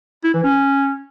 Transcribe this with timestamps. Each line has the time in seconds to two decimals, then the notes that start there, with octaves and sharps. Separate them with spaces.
0.24 E4
0.34 E3
0.43 C#4